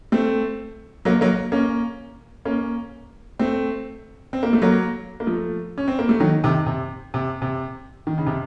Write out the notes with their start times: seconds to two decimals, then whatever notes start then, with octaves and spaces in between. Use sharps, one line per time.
0.12 A3 C4
1.05 F#3 A#3
1.21 F#3 A#3
1.52 A#3 C#4
2.45 A#3 C#4
3.39 A3 C4
4.33 C4
4.43 A#3
4.53 A3
4.62 F#3 A#3
5.20 A#3
5.27 F3 A3
5.78 C#4
5.88 C4
5.99 A#3
6.09 A3
6.20 D#3 F#3
6.44 C3 D#3
6.66 C3
7.14 C3
7.42 C3
8.07 D#3
8.18 C#3
8.26 C3